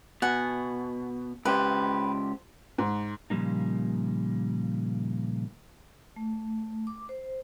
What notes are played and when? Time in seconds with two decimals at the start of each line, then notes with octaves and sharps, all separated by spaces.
0.22 B2 F#5 G#5
1.45 C#2 G4 B4 C5
2.78 G#2
3.30 A#2 C#3 F3 G3 A#3 D#4
6.16 A3
6.87 D6
7.09 C5